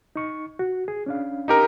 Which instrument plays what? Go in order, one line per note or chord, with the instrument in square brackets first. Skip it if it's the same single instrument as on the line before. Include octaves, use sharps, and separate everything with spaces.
[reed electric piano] D#4 C#6
F#4
G#4
C#4 D4 F5
[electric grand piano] D#4 G4 A#4